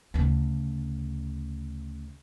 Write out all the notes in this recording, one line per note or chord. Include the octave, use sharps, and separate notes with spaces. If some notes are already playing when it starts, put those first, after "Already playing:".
D2 C#3